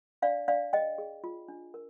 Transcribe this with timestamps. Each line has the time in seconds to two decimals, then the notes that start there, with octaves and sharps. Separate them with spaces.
0.22 D4 D5 F5
0.48 D4 D5 F5
0.73 G#4 D#5 G5
0.98 G#4
1.24 F4
1.48 D4
1.74 A#4